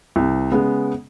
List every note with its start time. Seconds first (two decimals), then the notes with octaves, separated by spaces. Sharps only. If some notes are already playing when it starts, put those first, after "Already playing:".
0.16 C2 C3
0.52 C#3 G#3 B3